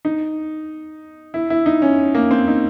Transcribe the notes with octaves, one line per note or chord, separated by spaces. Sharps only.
D#4
E4
E4
D#4
C#4
A#3
C4
D#4